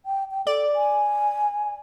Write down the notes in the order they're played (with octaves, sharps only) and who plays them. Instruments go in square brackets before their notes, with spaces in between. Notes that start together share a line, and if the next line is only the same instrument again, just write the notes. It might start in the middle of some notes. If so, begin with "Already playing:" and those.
[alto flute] G5
G5
[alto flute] A4 [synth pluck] D5
[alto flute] G#5